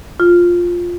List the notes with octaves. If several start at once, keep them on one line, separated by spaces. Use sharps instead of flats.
F4